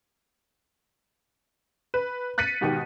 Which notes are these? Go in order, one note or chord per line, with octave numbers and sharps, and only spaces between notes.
B4
F#6 A6 B6 C#7 D#7
G#2 B2 D#3 G4